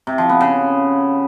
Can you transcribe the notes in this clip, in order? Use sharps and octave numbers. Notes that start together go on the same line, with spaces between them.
C3
F3
B3
C#3